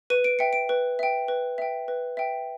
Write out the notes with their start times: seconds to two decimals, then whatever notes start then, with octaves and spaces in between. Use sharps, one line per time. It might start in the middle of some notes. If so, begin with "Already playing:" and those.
0.10 B4 D#7
0.24 D7
0.39 E5 G5 C#7
0.53 D7
0.69 B4
0.99 E5 G5
1.28 B4
1.58 E5 G5
1.88 B4
2.17 E5 G5